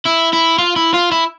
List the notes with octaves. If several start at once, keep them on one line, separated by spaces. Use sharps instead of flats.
E4
E4
F4
E4
F4
E4